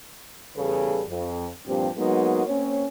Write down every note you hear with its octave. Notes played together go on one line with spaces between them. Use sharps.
E2 C#3 G3 G#4 A4 B4
F2
G2 A#2 F3 C4 G4
F#3 G#3 A#3 B3 D#4 F#4
A#3 C4 C#4 C#5